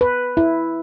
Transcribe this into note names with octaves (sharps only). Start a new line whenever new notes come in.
B4
E4